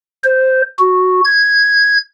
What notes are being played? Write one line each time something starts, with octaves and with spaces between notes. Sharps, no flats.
C5
F#4
G#6